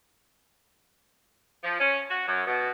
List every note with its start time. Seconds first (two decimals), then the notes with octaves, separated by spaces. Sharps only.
1.64 F3
1.80 C#4
2.11 F#4
2.28 F#2
2.47 B2